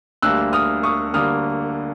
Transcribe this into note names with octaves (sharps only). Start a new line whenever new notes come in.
D2 D3 G3 A#3 E6 F#6
D#6 F6
C#6 D#6
D2 D3 G3 A#3 D#6 F6